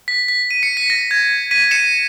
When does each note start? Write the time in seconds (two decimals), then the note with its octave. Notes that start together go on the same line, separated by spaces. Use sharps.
0.08 B6
0.28 B6
0.51 D#7
0.63 C#7
0.77 B6
0.90 A#6
1.11 G#6
1.51 B6 D#7
1.71 C#7 E7